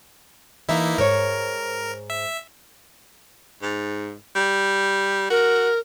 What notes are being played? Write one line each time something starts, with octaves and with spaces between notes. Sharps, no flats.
E3 A#3 D#4 E4 E5
G#2 A#4 C5 C#5
E5
G#2
G3
F#4 A#4